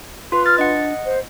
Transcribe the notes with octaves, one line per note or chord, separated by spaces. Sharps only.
F4 B4 C6
F6 A6
D4 D#5 F#5
C5